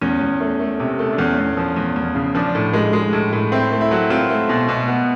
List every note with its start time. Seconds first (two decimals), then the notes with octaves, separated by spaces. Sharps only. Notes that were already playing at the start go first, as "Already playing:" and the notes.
0.01 E2 C#4
0.21 E2
0.40 A3
0.60 A3
0.79 C3
0.99 A3
1.13 D4
1.18 E2 C#4
1.38 E2
1.57 F3
1.76 E2
1.96 E2
2.15 C#3
2.35 F3 D4
2.55 A2
2.74 G#3
2.93 G#3
3.13 A2
3.33 A2
3.52 C4 E4
3.72 A3
3.81 E4
3.91 F#3
4.10 C4 F4
4.30 A3
4.49 B2
4.68 B2
4.88 B3